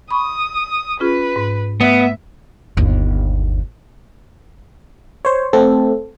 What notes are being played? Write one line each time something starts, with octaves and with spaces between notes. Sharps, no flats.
B5 C#6 D#6
C#4 F4 G#4 B4
G#2
A3 B3 E5 D#6
G1 D#2
C5 C#5
A3 C4 A4